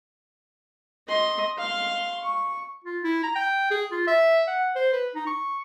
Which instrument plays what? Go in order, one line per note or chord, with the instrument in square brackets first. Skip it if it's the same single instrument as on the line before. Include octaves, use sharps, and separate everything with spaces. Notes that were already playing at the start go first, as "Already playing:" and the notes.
[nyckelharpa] D#5 C6
F5 C6
C#6
[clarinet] F4
E4
A#5
G5
G#4
F4
E5
F#5
C5
B4
D#4
C#6